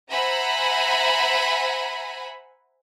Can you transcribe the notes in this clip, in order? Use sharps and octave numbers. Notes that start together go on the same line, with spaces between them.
C5 E5 F#5 G#5 A#5 B5